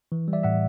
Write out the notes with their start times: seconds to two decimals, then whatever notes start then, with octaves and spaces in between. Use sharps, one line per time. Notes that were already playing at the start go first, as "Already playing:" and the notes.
0.12 E3
0.28 G3
0.33 D5 E5
0.43 A2 E5 F#5